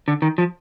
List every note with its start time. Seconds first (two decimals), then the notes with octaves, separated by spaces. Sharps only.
0.08 D3
0.22 D#3
0.38 F3